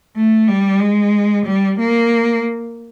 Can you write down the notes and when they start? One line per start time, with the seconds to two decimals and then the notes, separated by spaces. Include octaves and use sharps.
0.16 A3
0.48 G3
0.80 G#3
1.46 G3
1.79 A#3